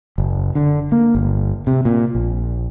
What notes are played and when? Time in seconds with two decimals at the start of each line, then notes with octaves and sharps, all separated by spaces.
0.18 F#1
0.55 D3
0.92 A#3
1.15 G1
1.67 C3
1.85 A#2
2.15 A#1